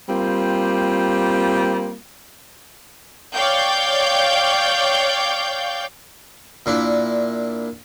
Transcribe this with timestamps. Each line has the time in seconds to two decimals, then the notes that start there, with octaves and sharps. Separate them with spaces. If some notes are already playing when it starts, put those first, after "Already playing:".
0.09 G3 A#3 C4 F4
3.33 C#5 D5 F5 G5 G6
6.66 A#2 D4 E4